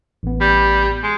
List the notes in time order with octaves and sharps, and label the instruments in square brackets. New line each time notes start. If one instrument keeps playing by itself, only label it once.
[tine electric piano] A1 B3
[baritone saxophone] G3
G#3